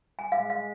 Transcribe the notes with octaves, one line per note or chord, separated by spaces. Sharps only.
G#5
G#3 F5
F5